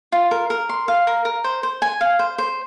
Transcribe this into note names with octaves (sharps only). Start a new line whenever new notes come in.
F4
A#4
A#4
C6
F5
A#4
A#4
C5
C5
G#5
F5
C5
C5